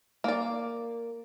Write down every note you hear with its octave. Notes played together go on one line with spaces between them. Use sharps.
A#3 D5